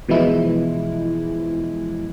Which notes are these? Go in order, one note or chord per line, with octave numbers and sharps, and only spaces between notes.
B2 E3 F3 G#3 E4